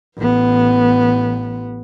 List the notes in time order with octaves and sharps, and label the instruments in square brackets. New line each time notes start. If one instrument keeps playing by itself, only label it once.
[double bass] A1 B3